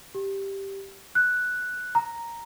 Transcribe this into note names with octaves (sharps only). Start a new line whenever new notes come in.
G4
F#6
A#5